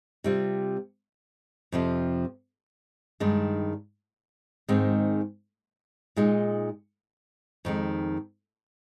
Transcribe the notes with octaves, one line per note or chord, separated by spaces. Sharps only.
C3 G3 C4 F4
F2 C3 F3
G2 D#3 G#3 D4
G#2 D#3 G#3 C4
A#2 G#3 D#4
F2 D#3 G#3